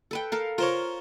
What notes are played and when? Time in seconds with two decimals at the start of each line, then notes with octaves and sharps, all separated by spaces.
0.11 A4 B4 G5
0.32 A4 A#4 F5
0.58 F4 A#4 C5 C#5